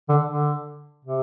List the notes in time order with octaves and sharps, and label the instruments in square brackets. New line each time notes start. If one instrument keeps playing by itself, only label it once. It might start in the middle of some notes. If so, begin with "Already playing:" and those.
[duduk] D3
D3
C3